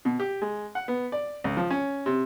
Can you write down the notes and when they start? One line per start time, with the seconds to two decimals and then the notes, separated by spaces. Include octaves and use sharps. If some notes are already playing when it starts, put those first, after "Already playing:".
0.05 B2
0.20 G4
0.42 G#3
0.75 F#5
0.88 B3
1.12 D5
1.44 C#2
1.57 F3
1.70 C#4
2.06 C3